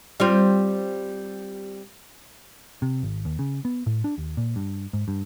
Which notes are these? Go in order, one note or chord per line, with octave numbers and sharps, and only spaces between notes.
G3 C4 F4
C3
G#1
D#2
C#3
B3
A2
D4
D#2
A#2
G2
G#2
G2